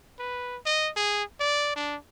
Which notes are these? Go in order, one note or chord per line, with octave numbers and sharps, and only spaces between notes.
B4
D#5
G#4
D5
D4